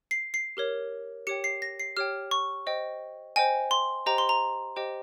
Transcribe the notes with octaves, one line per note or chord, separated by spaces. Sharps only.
C7
C7
G4 A#4 C#5
G4 C#5 G5 C#7
C7
A#6
C7
G4 C#5 G5 F6
C#6
C5 D#5 G5
C5 D#5 G5 G#5
C6
G4 C5 D#5 G5 A#5
C6
A#5
G4 C5 D#5 G5